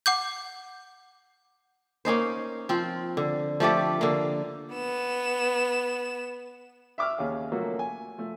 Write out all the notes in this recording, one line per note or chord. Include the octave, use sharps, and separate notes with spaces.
F#5 D6 G6
A#3 C#4 D#4 C5
F3 C4
D3
F3 A3 G4 D5
D3 A#3
B3 E7
E5 C#6 D6 E6 F6
D#2 C#4 G#4 F5
F3 F#3 A3 A#3 C#4 F#4
G#5
F3 A3